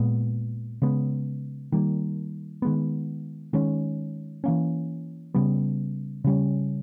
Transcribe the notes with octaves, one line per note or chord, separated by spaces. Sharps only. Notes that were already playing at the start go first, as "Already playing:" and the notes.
Already playing: A#2 G#3 B3
C#3 G#3 B3
D#3 G3 A#3
D#3 G#3 B3
D#3 G#3 C#4
E3 A#3 C#4
C#3 G3 B3
C#3 G3 C#4